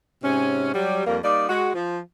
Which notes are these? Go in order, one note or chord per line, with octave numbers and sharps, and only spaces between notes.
G#2 C3 C#4
F#3 G3
F2 G3 A#3
G3 A#3 D#4 D5
G#3 F#4
F3